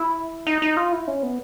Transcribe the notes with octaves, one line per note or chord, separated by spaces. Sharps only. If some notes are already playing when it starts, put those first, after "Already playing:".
Already playing: E4
D#4
D#4
F4
E4
C#4
B3